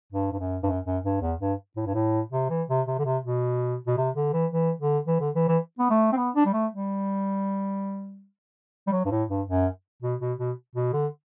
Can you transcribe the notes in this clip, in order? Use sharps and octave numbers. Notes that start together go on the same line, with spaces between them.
G2
G2
F#2
G2
F#2
F#2
G2
E2
G2
A2
G2
A2
C3
E3
C3
C3
D3
C3
B2
B2
C3
D3
E3
E3
D3
E3
D3
E3
E3
B3
A3
C4
B3
D4
G3
A3
G3
G3
F#3
G2
A2
G2
F#2
B2
B2
B2
B2
D3